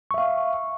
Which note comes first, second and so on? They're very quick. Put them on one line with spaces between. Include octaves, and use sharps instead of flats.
C#6 E5 F5